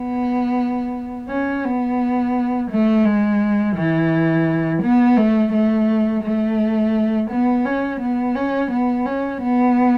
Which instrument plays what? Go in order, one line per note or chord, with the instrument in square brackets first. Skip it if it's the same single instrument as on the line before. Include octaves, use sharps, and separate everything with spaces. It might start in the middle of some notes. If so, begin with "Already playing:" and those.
Already playing: [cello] B3
C#4
B3
A3
G#3
E3
B3
A3
A3
A3
B3
C#4
B3
C#4
B3
C#4
B3